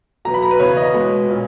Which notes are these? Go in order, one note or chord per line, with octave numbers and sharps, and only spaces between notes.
B2 F#3 B3 A#5
B5
A#5
B4
C#3 E3 B3 C#5
D#5
B2 G#3 B3
A#2 A#3 C#4